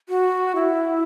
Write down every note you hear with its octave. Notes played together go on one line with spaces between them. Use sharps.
F#4
E4